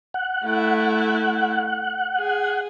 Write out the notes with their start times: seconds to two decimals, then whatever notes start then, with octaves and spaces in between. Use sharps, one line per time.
0.14 F#5
0.44 A3 E4
2.18 G#4